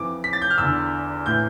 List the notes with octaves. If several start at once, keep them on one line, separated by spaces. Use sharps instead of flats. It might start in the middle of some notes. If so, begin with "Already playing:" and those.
Already playing: F2 E3 D6
B6
A6
G6
F6
E2 D3 E6
A2 E3 G6